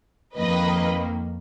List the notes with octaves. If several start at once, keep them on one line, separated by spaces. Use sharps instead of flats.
F2 D#3 A#3 B4 D#5